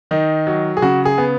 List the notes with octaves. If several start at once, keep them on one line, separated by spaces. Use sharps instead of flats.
D#3 D#4
F#3
G#4
C#3 F#4
G#4
B3